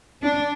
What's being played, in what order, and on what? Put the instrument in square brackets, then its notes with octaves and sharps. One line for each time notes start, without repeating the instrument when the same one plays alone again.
[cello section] D4